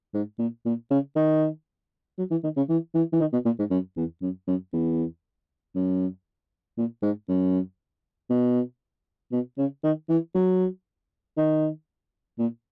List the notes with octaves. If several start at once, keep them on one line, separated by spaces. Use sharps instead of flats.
G#2
A#2
A#2
C#3
D#3
F#3
E3
D#3
C#3
E3
E3
E3
D#3
B2
A#2
G#2
F#2
E2
F#2
F#2
E2
F#2
A#2
G#2
F#2
B2
B2
C#3
D#3
E3
F#3
D#3
A#2